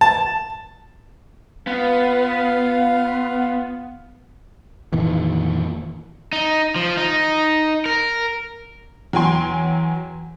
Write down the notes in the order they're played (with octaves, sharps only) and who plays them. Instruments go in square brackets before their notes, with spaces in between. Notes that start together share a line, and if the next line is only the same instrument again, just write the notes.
[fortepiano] A5
[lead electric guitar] B3 [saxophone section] F4 B4 F5
[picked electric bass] F2 A#2 D#3 E3
[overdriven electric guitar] D#4
F3
D#4
A#4
[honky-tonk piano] E2 F#3 G5 G#5 C6